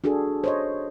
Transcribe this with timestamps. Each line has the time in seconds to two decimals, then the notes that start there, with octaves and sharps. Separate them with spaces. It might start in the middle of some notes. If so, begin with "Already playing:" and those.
0.04 D4 F#4 G#4 A4
0.44 C5 C#5 D#5